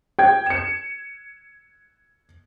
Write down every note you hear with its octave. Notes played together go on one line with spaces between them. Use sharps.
G5 G#6
C#7 E7